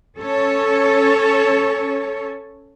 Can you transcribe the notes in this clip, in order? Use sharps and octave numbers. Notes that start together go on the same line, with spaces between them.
C#4 A4 C#5